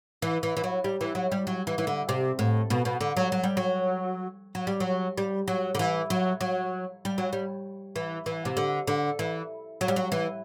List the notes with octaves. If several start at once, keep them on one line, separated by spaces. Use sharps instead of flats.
E3
E3
E3
F#3
G3
E3
F#3
G3
F#3
E3
E3
D3
C3
A2
B2
B2
D3
F#3
F#3
G3
F#3
F#3
G3
F#3
G3
F#3
D3
E3
F#3
F#3
G3
F#3
G3
E3
E3
C3
D3
D3
E3
F#3
G3
F#3
E3